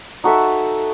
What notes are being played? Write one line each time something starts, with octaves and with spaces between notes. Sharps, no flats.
D#4 F#4 A4 E5